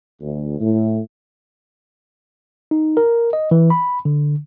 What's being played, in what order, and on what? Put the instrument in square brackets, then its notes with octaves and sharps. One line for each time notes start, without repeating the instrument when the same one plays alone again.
[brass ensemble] D2
A2
[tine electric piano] D#4
A#4
D#5
E3
B5
D3